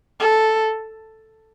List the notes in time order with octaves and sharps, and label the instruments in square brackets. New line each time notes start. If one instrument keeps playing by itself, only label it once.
[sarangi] A4